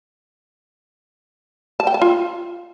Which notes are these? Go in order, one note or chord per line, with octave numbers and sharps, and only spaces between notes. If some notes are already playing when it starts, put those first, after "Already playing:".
A5
G5
A5
F4